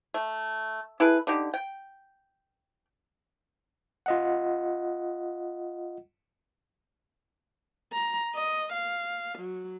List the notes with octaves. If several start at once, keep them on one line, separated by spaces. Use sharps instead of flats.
A3
E4 G#4 A4 B4
D3 D#4 G4
G5
F4 D#5 F#5
A#5
D#5
F5
F#3